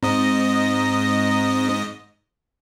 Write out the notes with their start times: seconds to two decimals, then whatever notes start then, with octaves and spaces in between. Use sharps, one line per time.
0.03 G#2 C4 D#5 A#5